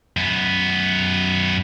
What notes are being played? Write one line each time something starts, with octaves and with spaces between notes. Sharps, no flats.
F#2 B3